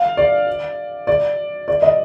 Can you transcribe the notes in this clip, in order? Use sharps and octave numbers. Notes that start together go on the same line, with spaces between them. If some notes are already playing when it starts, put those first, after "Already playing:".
Already playing: F5
D5
D5
D5
D#5